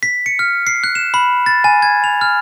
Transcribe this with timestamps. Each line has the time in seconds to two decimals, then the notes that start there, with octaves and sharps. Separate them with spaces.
0.03 B6
0.26 C#7
0.39 F6
0.67 C7
0.84 F#6
0.95 E7
1.14 B5
1.46 A6
1.64 G#5
1.82 G#6
2.04 F7
2.21 F6